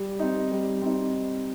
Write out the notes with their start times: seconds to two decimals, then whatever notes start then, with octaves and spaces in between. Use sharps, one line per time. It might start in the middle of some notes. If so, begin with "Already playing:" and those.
Already playing: G3
0.19 C4 D#4
0.52 G3
0.82 C4 D#4